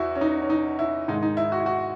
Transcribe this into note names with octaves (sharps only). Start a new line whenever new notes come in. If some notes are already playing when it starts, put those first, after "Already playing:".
Already playing: E2 E4 F#4
C#4
D#4
C#4
D#4
E4
G#2 D#3 G#3 D#4
D#4
E4
F#4
E4
F#4